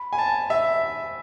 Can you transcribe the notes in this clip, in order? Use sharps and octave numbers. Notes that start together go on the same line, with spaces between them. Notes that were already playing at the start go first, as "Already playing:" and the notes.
Already playing: B5
G#5
A5
E5